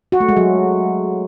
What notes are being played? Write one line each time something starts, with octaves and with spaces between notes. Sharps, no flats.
F#4
A3
G#3
F#3